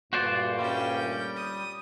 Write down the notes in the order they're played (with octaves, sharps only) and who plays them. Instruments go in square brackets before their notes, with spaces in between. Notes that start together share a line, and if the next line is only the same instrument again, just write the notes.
[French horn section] D2 G2 A#2 [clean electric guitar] F#4 C5 D5
[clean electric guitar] G3 [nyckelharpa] C#4 G5
[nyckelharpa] D#6